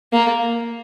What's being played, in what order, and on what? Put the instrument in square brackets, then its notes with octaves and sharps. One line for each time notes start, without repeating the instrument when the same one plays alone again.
[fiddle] A#3